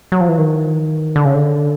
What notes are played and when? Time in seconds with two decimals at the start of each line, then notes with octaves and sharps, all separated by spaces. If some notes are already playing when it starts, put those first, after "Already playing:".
0.12 F#3
0.21 F3
0.29 E3
0.38 D#3
1.16 D3
1.25 C#3
1.34 D3